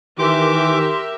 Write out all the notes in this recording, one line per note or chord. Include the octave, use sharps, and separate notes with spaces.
D#3 E3 G4 A#4 E5 C6 D6